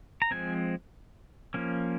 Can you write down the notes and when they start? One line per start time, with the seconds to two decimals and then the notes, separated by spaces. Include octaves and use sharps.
0.22 A#5
0.31 F3 G#3 C4 G#5
1.54 F3 A#3 C#4